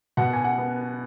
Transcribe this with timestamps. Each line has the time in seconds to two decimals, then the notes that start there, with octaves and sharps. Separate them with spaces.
0.17 B2 F#5
0.33 G#5
0.44 F#5
0.58 B3